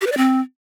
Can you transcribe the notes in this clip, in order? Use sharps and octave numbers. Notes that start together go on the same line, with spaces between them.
G4
B4
D5
C4